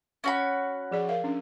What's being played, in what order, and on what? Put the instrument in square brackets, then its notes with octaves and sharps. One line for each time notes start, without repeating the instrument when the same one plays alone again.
[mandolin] C#4 F#4 B5
[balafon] F3 G#4 D5
A#4 E5 F5
C#4 D4